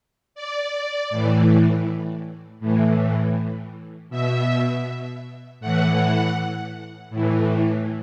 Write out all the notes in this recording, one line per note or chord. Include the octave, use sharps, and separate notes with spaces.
D5
A2 E3
A2 E3
B2 E5
A2 E3 F#5
A2 E3